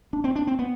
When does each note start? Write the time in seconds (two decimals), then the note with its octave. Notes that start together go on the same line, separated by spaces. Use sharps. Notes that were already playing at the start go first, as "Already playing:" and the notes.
0.13 D4
0.24 C4
0.36 D4
0.47 C4
0.59 B3